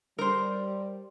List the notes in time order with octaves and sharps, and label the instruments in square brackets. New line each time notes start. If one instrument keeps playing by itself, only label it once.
[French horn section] G3 [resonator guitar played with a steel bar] A#4 C5